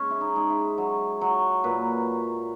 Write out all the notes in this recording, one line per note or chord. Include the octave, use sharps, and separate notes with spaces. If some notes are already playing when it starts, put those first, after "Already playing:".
Already playing: G#3 C#4
E4
D#4
G#3
E4
F#3
F#3
A#2 B4